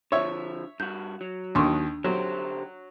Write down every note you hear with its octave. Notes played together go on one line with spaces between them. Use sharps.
D3 F3 C#5 E5
G2 F#4 G6
F#3
D#2 D#3 D4 C6 C#6
D3 F#3 G4 C5